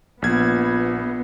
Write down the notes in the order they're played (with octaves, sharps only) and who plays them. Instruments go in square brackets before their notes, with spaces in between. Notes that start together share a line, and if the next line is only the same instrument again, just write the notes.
[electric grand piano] A#1 G#6 [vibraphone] A#3 F4 [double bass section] B3